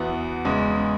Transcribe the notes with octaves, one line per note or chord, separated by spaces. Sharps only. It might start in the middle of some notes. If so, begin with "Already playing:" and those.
Already playing: E2 E3 B3 F#4
E2 C#3 G#3